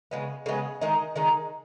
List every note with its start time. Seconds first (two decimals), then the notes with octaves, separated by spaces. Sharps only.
0.11 C#3 G#3 B3
0.46 C#3 G#3 B3
0.81 D#3 G#3 D#4
1.16 D#3 G#3 D#4